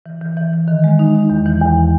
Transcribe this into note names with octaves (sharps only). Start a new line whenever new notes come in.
E3
E3
E3
E3
D#3
G#3
D#4
D#4
E2
E3
E2